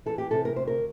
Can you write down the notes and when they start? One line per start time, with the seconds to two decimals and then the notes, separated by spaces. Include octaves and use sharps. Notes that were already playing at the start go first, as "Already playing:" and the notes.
0.06 E3 A4
0.18 G4
0.31 C3 A4
0.45 A#4
0.56 D2 C5
0.67 A#4